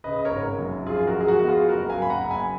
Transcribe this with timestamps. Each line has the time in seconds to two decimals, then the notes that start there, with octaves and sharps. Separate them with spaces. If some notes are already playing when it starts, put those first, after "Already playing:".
0.04 C#3 B4 D#5
0.16 D#5
0.25 A#4 C#5
0.32 G#1
0.59 F#2
0.86 F3 F4 G#4
1.07 F#4 A#4
1.14 G#3
1.21 G#4
1.28 F#4
1.39 B3 F#4
1.49 F4 G#4
1.69 F#1 F#4 A#4
1.90 F5 G#5
1.96 F#1
2.02 B5
2.10 F#5 A#5
2.24 F#1
2.31 G#5 B5